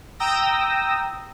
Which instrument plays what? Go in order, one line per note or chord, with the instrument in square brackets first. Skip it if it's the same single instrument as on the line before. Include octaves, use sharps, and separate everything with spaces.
[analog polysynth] G5 A#5 D#6 E6 A#6